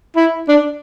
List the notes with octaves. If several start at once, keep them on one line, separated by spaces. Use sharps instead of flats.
E4
D4